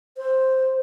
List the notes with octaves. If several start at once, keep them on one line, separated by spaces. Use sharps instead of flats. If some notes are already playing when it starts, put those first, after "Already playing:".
C5